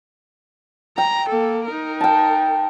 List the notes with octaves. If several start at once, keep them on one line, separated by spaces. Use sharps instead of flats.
G5 A#5
A#3 A4
D#4 A#4
G5 A5